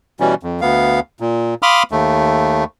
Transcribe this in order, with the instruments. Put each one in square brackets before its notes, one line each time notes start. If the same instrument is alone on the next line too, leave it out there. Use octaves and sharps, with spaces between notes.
[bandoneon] B2 E3 G3 C#4
F2
D2 B3 F5
A#2
F5 B5 C6 D6 D#6 F6
D#2 A3